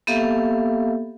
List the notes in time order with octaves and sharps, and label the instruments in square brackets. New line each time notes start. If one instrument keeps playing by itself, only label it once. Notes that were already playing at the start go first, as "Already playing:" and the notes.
[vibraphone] A#3 B3 G4 A4 E5 F5